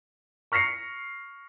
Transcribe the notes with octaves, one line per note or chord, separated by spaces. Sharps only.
C#6 F6 A#6 C7 C#7